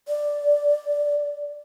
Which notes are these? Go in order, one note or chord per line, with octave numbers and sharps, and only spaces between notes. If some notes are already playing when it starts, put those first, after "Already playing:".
D5